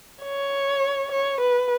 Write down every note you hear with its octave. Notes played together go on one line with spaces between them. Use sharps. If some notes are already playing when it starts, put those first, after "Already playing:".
C#5
C#5
B4